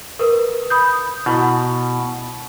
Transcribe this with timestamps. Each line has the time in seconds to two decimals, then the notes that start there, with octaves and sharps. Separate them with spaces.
0.19 A#4 B4
0.70 B5 D#6 G6
1.26 B2 E4